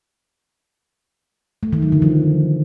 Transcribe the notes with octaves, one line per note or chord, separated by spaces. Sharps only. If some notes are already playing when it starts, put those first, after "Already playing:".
A3
D#3
F#3
D3
F3